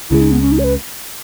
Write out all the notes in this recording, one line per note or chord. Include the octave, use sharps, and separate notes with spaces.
C#2 C#3 G#3 E4
D#4
B3
C#4
D#4
C#5
B4